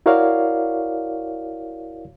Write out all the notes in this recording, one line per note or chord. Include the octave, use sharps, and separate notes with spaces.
E4 F#4 A#4 C#5 D5 F5